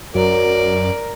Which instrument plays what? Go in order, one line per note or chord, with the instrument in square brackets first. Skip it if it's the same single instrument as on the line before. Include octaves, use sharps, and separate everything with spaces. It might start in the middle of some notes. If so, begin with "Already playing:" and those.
[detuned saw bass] F#2 [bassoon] F#3 [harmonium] A#4 [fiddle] D5